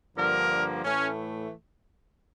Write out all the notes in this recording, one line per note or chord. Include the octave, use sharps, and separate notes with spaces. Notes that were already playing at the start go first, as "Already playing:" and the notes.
G2 D3 F3 A#3 A#4
A2 E3 A3 C#4